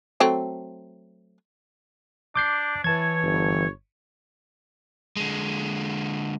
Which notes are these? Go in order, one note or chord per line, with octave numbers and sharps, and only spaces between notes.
F#3 A3 C4
D4 D6 G6 C7
E3 B4 C#5 A5 G#6
G1
D3 G#3